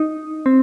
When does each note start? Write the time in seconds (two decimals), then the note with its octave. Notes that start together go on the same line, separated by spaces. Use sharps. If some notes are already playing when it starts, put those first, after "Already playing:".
Already playing: D#4
0.46 C4